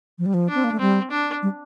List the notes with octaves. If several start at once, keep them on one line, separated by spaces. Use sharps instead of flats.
F3
G3
F3
D4
C4
A#3
A3
G3 C4
D4
G3